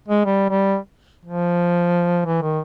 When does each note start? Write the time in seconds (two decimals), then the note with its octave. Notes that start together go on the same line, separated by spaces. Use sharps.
0.08 G#3
0.25 G3
0.50 G3
1.25 F3
2.25 E3
2.42 D#3